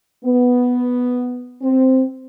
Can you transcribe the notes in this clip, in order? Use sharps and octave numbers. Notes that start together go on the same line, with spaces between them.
B3
C4